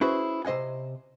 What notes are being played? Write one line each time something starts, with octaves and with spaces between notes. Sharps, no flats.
C#4 E4 F#4 G#4 B4 C5
C3 C5 D#5 F#5 G#5